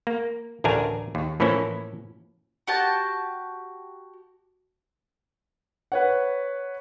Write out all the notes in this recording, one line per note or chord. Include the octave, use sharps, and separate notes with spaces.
A#3
A1 D2 A3 D4 A#4 G#5
D#2
A2 E3 F3 A#3 C#4 E4
F#4 G4 A5
B4 C#5 F#5